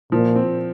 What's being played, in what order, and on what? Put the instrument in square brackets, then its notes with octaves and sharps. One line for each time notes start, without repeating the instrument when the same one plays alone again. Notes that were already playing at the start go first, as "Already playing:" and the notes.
[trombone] A#2 [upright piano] F3
[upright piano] C4